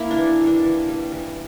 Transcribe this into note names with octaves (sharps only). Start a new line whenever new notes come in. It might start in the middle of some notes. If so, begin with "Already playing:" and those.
Already playing: A#3 E4
D4
E3
G3
D4
E3
G3
E3